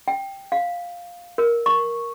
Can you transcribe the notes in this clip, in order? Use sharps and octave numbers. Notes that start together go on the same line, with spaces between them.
G5
F5
A#4
C#6